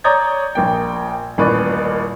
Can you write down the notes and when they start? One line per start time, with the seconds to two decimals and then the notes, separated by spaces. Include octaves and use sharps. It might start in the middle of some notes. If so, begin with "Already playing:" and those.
0.04 C#5 D5 A#5 D#6 G6 G#6
0.55 A#1 A#3 G5
1.38 D#1 A1 A#2 B4 D5 C#6